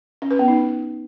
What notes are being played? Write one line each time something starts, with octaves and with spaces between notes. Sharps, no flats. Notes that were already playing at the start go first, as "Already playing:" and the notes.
C#4
B4
B3
D#4